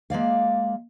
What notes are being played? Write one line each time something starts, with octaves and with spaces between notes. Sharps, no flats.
G#3 A#3 D5 F5